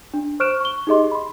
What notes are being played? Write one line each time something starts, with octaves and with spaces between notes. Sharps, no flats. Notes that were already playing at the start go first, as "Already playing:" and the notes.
D4
C5 C#6 F6 F#6 D7 E7
C#6 G7
D#4 G4 G#4 D#5 C6
B5 C6